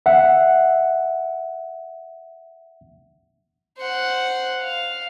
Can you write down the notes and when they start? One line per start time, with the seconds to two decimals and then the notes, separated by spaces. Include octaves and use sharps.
0.06 E5 F#5
3.79 C5 F#5
4.62 F5